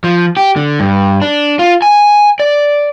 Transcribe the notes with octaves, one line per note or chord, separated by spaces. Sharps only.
F3
G4
D3
G2
D4
F4
G#5
D5